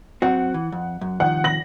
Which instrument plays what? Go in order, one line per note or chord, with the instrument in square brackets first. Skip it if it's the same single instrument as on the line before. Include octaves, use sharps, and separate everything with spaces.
[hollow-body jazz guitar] F#2 C4 F#4 [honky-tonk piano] F#5
[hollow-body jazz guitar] E3
F2
F#2
[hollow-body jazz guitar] C2 D#3 F3 [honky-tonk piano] F#5
[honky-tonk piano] A#6 F#7